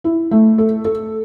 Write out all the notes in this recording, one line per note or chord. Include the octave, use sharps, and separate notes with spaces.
E4
A3
A4
A4